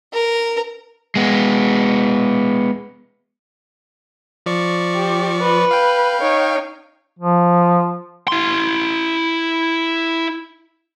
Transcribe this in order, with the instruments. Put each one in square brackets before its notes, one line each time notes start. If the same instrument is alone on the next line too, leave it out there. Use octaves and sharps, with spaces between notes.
[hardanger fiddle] A#4
[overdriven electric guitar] G#3 B3
[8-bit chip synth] F3 D5 C#6
[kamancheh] G4
B4
[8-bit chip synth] F5 G5
[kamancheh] D#4 C#5
[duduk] F3
[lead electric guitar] E4 C6